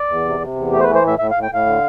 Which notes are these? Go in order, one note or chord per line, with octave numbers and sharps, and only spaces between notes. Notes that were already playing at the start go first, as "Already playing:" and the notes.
Already playing: D5
E2
C3
C3
E2
A3 G4
C5
B4
E3
C5
A2 E5
A2 E5
F5
A2
G5
A2 F5
D3